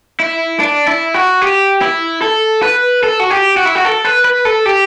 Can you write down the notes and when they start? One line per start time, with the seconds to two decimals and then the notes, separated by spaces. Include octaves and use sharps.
0.20 E4
0.60 D4
0.87 E4
1.14 F#4
1.42 G4
1.82 E4
2.22 A4
2.63 B4
3.03 A4
3.20 F#4
3.30 G4
3.57 F#4
3.65 E4
3.75 F#4
3.85 A4
4.05 B4
4.25 B4
4.45 A4
4.66 G4